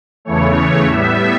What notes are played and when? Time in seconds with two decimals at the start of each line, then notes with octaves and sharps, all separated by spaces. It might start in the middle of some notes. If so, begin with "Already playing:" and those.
0.25 E2 C#3 E3 A3 C#5
0.85 A2 G3 B3 E5